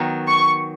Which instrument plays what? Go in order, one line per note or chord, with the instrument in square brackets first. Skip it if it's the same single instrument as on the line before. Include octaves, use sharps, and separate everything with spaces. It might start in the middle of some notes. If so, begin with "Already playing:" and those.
Already playing: [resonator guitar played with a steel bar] D#3 F#3 B3
[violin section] C#6